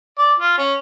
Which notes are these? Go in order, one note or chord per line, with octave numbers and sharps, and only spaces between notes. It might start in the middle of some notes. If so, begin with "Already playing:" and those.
D5
F4
C#4